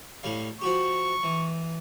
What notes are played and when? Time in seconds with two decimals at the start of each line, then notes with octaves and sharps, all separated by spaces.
0.23 A2 G3 F5
0.61 F3 F#4 G4 C#6
1.23 E3